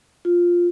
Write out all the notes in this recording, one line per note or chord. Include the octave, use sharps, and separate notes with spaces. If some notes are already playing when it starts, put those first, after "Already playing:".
F4